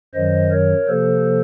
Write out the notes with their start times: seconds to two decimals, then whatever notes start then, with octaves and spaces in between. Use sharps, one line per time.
0.14 F#2 D#3 F#3 C5 D#5
0.51 A#4 C#5
0.88 C3 F3 A#3 A4 C5